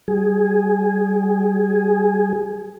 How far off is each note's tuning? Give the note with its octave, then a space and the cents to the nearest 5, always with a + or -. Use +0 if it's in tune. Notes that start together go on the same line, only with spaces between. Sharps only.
G3 -20 G#4 +0